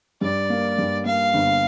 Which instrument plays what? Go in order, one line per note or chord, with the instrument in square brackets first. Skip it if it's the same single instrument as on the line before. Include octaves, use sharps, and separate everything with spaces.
[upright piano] G2 [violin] D5
[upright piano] A#3
G2
[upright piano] A#3 [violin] F5
[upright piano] G1